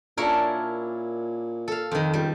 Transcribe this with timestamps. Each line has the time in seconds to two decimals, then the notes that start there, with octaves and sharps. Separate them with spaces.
0.17 A#2 C#4 D4 E4 A#4 C#5
1.68 A4 F5
1.91 F2 D#3
2.14 C#2 G3